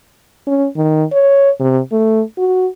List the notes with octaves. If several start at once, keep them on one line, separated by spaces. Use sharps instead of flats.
C#4
D#3
C#5
C3
A3
F#4